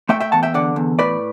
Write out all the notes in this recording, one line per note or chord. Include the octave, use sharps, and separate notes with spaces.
A3 E5 G5
E5 G5
E2 F#5 A5
E5 G5
D3 D5 F#5
E2
A2 B4 D5